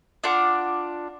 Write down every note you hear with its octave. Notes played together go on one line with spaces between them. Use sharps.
D4 F4 F#5 D6